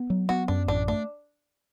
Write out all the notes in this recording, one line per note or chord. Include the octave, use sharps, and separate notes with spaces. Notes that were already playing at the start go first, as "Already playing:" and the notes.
Already playing: B3
F#3
B3 F#4
F#2 D4
A1 D4
A3 D4